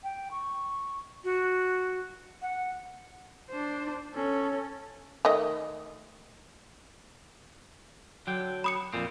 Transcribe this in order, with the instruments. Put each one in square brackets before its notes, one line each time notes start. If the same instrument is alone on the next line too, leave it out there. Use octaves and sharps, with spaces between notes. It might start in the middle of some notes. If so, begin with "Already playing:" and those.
[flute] G5
C#6
F#4
F#5
[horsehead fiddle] D4 C5
C#4 A4
[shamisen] D#3 A3 D#5
[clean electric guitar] D3 F#3 G5
[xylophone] B5 D#6 C#7
[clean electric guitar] F2 A#2 C4